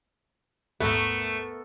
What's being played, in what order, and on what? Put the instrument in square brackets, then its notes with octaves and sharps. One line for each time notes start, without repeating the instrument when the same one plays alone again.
[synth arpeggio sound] A#1 D#2 G#2 [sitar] A3 [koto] B3 A4 A#4